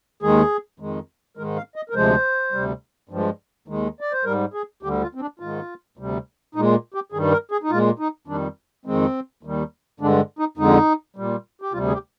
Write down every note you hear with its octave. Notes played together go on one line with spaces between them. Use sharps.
D#2 D#3 G#3 G#4
F2 D#3 G#3
G#2 D#3 G#3 A#4
F5
D#5
A#4
D2 C3 F3 G#3 C5
D2 C3 G3
G2 F3 G#3
D#2 D#3 G#3
D5
C5
G#2 G3 A#4
G#4
D2 D3 G3 G4
F4
C4
D4
G#2 D#3 G#3 F4
D2 C3 G3
A#2 G#3 D#4
G4
G2 D#3 G3 G#4
A#4
G#4
D#4
A#2 G#3 F4
D#4
F2 D#3 G3 D4
F2 D#3 G#3 C4
D#2 D#3 G3
G2 D3 G#3 D4
D#4
F2 D3 G#3 D#4
A#2 G3
G4
D2 C3 G3 F4
G#4
G4